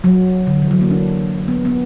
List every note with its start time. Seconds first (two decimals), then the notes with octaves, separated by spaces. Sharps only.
0.04 F#3
0.47 D3
0.62 E3
0.71 F#3
0.81 A#3
0.91 D4
1.48 B3
1.65 B3